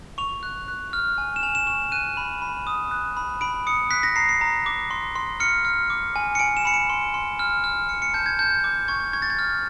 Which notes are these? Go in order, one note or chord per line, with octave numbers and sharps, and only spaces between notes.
C#6 F7
F#6
F#6
F6
G#5
E7
G#5 F7
E7
C#6 E7
F#6 D#7
B5
B5
D#6
F#6
B5
B5 D7
D#6 C#7
F#6 B6
A#6
A#5 C7
C7
A#5
D6
C6
C6
F6 C#7
F6
D6
G#5
C#7
G#5 D7
E7
B5 C#7
D7
C6
C6
F6
F6
F6 C#7
C#7
A5 G6
G#6
A5 G6
D6
C#6 G#6
C#6 G#6
A6
G#6
F6